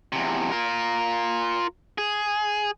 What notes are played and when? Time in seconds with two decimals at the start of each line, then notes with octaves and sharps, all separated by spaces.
0.12 E2 C3
0.52 F4 A#4
1.98 G#4